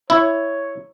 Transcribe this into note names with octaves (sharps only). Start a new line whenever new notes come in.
E4 C#5